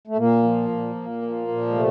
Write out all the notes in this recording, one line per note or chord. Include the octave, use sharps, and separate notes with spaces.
A3
A#2 A#3
F3
A#2
A#2
F3
A#2
G#3
C3 A3